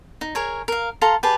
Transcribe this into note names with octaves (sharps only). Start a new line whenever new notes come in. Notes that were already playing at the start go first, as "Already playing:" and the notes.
D#4
G#4 A#4 C#5
A#4 F5
A4 F5 A#5 C6
G4 G#4 B4 A5